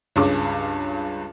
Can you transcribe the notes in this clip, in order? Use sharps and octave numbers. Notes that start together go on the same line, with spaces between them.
C#2 G2 C#4 G#4 D6